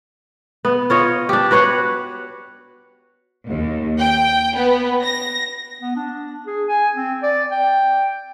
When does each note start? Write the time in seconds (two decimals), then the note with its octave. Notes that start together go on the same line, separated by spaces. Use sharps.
0.65 B3
0.90 F4 C#5 D#5
1.29 D4 G4
1.51 F#4 B4 C#5 F#5
3.47 D#2
3.99 G5
4.55 B3
5.03 A#6
5.81 B3
5.96 D4
6.47 G#4
6.68 G#5
6.95 C4
7.23 D5
7.51 G5